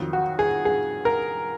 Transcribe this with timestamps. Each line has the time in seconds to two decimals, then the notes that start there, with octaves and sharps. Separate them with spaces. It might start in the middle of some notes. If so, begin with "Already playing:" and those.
Already playing: F2 D#3 F#3
0.13 F#4
0.39 G#4
0.65 G#4
1.05 A#4